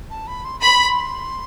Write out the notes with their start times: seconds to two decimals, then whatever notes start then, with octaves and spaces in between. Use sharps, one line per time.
0.10 A5
0.27 B5
0.45 C6
0.60 B5 C6